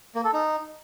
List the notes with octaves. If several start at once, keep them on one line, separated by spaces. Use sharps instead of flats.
A#3
A4
D#4